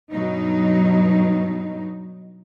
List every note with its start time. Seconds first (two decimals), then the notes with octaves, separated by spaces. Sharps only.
0.11 G2 B2 F#3 D#4